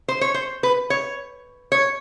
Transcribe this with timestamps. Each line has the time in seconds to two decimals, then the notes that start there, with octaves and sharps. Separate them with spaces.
0.08 C5
0.21 C#5
0.34 C5
0.63 B4
0.90 C#5
1.72 C#5